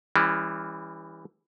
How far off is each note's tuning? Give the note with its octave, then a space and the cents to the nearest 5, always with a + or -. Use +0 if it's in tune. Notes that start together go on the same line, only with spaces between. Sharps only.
E3 +0 G3 +40 C#4 +20